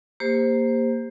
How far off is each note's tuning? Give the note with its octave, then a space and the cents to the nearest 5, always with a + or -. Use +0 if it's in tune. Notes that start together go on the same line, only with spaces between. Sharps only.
A#3 +0 G4 +30 C5 +0